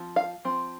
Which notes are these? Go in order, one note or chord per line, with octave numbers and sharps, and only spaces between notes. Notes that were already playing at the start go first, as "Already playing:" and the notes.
Already playing: F3 C4
F5
F3 C4